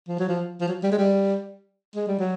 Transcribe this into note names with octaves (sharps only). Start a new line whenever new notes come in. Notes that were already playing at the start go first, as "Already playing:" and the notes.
F3
F#3
F3
F3
F#3
G3
G#3
G3
G#3
G3
F#3